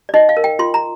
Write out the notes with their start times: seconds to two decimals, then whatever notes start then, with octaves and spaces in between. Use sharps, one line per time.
0.09 D5
0.14 D#4 D#5
0.29 F5
0.37 A#4
0.44 G5
0.59 F4 C6
0.74 A#5